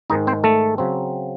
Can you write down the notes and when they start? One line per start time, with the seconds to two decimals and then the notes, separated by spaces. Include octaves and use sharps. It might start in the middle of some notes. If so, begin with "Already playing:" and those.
0.10 G#2 D#3 G#3 D#4 D#5
0.27 C4 C5
0.44 A3 A4
0.78 C#3 F#3 C4